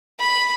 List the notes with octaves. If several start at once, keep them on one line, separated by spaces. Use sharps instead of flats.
B5